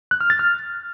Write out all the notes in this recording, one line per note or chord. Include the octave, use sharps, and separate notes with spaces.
F#6
F6
A6
F6